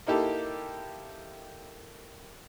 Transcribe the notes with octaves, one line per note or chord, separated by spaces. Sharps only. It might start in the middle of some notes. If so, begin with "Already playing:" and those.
A#3 D#4 E4 G4 A4